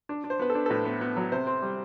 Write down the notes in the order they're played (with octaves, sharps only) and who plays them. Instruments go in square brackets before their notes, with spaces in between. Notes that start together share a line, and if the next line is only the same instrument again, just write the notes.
[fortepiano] D4
D4
C5
B3 B4
A4
D4
A4
A2 B4
B3
B3
F#3
C3 C5
C4
G3